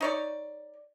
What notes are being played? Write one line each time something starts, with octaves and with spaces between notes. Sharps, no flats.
D#4 C#5 D5